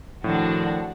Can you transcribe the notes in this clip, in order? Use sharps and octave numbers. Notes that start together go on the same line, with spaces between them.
A2 D#3 F3 D4 F#4